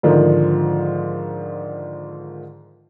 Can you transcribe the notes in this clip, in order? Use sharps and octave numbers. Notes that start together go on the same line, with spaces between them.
G#2 D3 D#3 F3